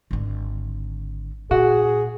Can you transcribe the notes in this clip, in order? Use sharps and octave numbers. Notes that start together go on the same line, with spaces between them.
G#1 D3
A#2 F#4 G#4